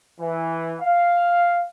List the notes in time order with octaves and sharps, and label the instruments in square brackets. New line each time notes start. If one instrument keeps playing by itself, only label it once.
[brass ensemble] E3
F5